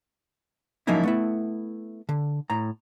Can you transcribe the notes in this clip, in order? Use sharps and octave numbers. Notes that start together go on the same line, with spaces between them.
F3 F#3 A#3 C#4 D#4 E4
A3 B3 E4
D3
A2 A#5